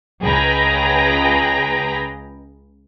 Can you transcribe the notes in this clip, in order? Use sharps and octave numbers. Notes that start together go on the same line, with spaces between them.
C#2 G#4 B4 G5 A#5 A#6